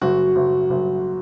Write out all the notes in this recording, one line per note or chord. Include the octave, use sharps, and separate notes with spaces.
F#1 F#4
F#1
F#1